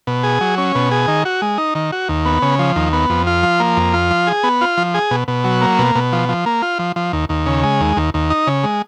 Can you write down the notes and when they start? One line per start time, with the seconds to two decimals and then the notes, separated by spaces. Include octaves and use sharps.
0.07 B2
0.24 G#4
0.41 F#3
0.58 C#4
0.75 B2
0.91 G#4
1.08 D#3
1.25 F#4
1.42 G#3
1.58 D#4
1.75 D#3
1.92 F#4
2.09 D#2
2.26 B3
2.42 C#3
2.59 F3
2.76 D#2
2.93 B3
3.10 F2
3.27 F4
3.43 F3
3.60 A#3
3.77 F2
3.94 F4
4.11 F3
4.27 G#4
4.43 B3
4.61 F4
4.77 F3
4.94 G#4
5.11 B2
5.28 B2
5.44 F#3
5.61 A#3
5.79 B2
5.95 B2
6.12 F3
6.29 F3
6.46 A#3
6.62 F4
6.79 F3
6.96 F3
7.13 D#2
7.29 D#2
7.46 C#3
7.63 G#3
7.80 D#2
7.97 D#2
8.14 D#2
8.30 D#4
8.47 C#3
8.64 G#3